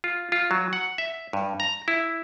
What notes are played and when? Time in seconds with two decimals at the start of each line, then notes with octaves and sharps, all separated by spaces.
0.04 F4
0.32 F4
0.51 F#3
0.73 F#5
0.98 E5
1.33 G2
1.60 A#5
1.88 E4